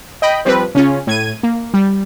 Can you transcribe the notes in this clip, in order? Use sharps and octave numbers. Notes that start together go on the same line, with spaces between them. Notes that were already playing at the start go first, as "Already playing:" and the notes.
D#5 G5 B5
F3 G3 C4 B4
C#3 C#4 F4
A2 G#6 D#7
A#3
G3